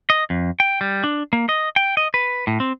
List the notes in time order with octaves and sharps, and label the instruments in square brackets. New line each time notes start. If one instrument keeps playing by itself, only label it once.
[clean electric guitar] D#5
F2
G5
G3
D4
A#3
D#5
G5
D#5
B4
A2
C4